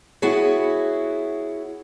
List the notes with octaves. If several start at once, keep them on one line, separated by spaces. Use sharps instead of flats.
B3 E4 F#4 G#4 C#5